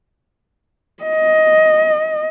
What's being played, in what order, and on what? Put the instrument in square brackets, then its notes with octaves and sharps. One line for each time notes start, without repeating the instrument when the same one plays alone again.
[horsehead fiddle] D#5